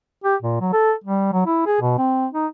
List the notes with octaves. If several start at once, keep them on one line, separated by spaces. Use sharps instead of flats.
G4
A#2
F#3
A4
G3
F#3
E4
G#4
B2
C4
D#4